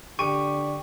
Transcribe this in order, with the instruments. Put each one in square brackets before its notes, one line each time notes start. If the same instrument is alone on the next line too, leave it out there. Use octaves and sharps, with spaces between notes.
[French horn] D3 [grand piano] G4 D#7 [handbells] C#6